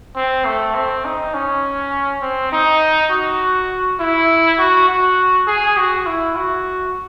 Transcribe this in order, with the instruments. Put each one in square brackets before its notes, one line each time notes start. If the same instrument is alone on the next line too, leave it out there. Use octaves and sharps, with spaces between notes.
[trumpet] C4
A3
C4
D#4
C#4
C4
D#4
F#4
E4
F#4
F#4
G#4
F#4
E4
F#4